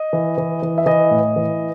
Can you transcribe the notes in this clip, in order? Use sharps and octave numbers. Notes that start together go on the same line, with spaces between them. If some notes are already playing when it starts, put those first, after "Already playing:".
Already playing: D#5
E3
E3
E3
E5
E3 D#5
A2
E3